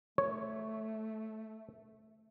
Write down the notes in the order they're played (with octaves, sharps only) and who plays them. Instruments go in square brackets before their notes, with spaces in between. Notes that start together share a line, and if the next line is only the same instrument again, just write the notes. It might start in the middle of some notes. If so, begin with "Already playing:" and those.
[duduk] A3 [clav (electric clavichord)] C#5